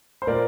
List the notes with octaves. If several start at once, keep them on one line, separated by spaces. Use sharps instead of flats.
C5
A#2 A#4 D5